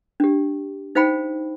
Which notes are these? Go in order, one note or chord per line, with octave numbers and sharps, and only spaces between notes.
D4 G4
D#4 C5 F5 G5 B5